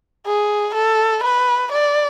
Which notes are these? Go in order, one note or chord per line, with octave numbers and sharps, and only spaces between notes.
G#4
A4
B4
D5